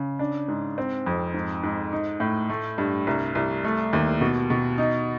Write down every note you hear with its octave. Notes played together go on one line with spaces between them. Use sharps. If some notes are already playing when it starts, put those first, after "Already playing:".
Already playing: C#3
D4
G#2
C4
F2
G#2
G#2
D#4
A2
A3
G2
C2
C2
A3
D#2
B2
B2
D#4